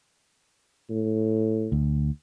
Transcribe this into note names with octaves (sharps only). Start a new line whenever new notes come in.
A2
D2